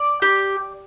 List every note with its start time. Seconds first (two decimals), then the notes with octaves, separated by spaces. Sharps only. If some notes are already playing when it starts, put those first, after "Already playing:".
Already playing: D5
0.22 G4